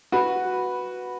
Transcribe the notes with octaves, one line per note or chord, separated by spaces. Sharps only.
F#4 B4